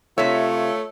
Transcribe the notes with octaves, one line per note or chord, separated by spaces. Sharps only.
C3 A3 F4 C#5 E5